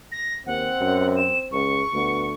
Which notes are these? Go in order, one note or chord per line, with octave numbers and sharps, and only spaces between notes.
A#6
D#2 C4 F#5
F#2
E7
C#2 C#6
D2 B3